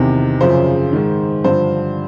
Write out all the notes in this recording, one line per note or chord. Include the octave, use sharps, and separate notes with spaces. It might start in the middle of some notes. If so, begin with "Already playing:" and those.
Already playing: E2 C3 D#3
F#2 C#3 F3 C5
G#2 D#3
G2 D3 F3 C5